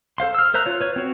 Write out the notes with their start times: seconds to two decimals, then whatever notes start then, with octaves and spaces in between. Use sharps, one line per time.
0.18 A4 C5 F5 C6
0.35 E6 F6
0.54 A#4 C5 E5 A#5 F#6
0.66 F4 C#5
0.81 B4 C#5
0.96 C4 F#4